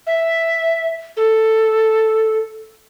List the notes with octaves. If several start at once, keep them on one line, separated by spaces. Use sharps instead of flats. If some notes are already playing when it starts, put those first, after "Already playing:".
E5
A4